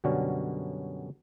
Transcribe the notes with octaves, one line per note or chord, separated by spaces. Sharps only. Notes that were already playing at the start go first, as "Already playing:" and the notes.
F#2 B2 D3 F#3 G3 C#4